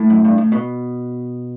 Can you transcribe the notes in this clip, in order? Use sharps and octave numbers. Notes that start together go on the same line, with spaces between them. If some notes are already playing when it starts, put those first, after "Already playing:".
Already playing: A2
F#2
G2
A2
B2